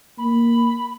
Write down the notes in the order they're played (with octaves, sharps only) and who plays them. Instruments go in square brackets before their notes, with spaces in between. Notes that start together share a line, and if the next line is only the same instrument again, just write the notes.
[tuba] A#3 [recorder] B5